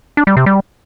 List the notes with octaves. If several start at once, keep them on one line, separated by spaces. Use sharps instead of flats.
D4
G3
C3
G3